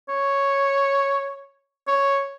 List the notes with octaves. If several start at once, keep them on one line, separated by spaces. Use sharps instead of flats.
C#5
C#5